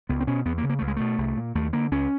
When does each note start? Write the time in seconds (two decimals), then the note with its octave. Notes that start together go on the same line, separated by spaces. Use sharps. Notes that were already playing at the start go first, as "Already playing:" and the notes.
0.09 C#2 B3
0.20 C4
0.27 B2 C#4
0.45 E2 B3
0.58 A#3
0.63 C#3
0.69 A#3
0.79 C#2 A3
0.87 G#3
0.96 B2 A3
1.18 C2
1.37 A#2
1.55 D#2 A3
1.73 D3 A#3
1.91 C#2 C#4